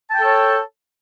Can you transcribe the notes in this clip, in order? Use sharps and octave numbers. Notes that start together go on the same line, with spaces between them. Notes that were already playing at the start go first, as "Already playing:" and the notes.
A4 C#5 G5 A5